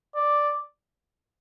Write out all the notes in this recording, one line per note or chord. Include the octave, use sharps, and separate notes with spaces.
D5